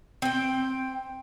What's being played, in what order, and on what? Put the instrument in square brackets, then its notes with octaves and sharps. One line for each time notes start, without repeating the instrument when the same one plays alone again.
[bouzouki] C4 G5